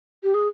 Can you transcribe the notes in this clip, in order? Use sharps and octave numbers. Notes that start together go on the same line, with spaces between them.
G4
G#4